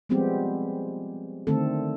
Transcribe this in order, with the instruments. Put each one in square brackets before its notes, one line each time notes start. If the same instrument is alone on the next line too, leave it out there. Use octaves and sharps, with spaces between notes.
[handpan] F3 G3 G#3 B3 C4 G4
D3 D#3 A3 C4 A4